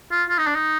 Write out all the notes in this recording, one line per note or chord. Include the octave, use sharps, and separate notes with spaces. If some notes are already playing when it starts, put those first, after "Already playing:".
F4
F4
D#4
D4
D#4